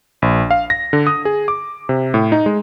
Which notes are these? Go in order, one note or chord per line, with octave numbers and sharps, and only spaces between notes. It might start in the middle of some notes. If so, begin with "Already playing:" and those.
A#1
F5
A#6
D3
D#6
G#4
D6
C3
A2
D#4
G#3